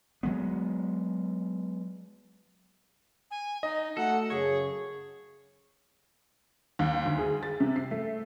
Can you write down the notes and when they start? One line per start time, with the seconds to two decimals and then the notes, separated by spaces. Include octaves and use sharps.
0.23 F#3 G#3 B3
3.31 G#5
3.63 D#4 D#5
3.97 A3 F#4 A4 F#5
4.30 F#2 C#3 G#4 C#5
6.79 D#2
7.06 D2
7.18 G#4
7.43 A6
7.60 C3
7.76 C7
7.91 A3